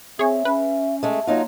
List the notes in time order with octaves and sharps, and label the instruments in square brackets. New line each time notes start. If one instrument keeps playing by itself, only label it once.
[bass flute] C4 [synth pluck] G#4 C#5 [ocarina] E5
[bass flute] C#4 [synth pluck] B4
[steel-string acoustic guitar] G#3 A3
[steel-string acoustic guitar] F#3 D#4 F4 [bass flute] A#3